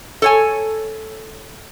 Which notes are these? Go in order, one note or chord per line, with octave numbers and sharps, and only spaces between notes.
A4 C#5 G#5